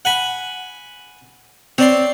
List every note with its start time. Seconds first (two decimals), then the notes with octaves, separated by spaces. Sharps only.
0.05 F#5 G#5 B5
1.78 C4 C#5 D5 C6